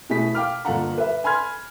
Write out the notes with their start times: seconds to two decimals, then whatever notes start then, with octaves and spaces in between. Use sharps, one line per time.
0.10 B2 A3 E4 G#4 B6
0.35 F5 G5 D6 F6
0.65 G1 A#2 A4 F5 F#5 A#5
0.98 B4 E5
1.24 G#5 B5 C6 F6 G#6